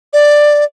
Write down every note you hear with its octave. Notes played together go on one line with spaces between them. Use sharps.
D5